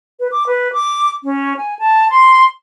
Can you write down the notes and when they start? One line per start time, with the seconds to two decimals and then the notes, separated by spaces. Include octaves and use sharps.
0.20 B4
0.32 D6
0.47 B4
0.73 D6
1.24 C#4
1.57 G#5
1.79 A5
2.10 C6